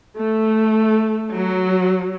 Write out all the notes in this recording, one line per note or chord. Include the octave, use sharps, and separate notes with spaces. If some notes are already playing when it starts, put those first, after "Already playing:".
A3
F#3